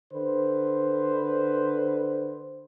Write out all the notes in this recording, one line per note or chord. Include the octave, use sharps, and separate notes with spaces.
D3 B4 C5